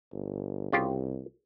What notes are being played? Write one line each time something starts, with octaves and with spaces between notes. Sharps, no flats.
G1
C2 C#3 F4 G4